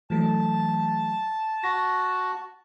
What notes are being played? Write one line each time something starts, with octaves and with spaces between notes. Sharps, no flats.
E3 F#3 A3 A5
F#4 A#6